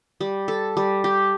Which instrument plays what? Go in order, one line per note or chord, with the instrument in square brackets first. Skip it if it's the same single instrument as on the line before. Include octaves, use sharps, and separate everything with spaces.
[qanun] G3
A4
G3
G4